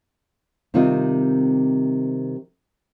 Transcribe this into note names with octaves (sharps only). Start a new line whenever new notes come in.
C3 D#3 G3 C4 F4 D#5